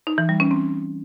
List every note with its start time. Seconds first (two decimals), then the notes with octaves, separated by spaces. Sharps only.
0.07 D#4
0.18 E3
0.29 G3
0.40 C#4
0.51 C4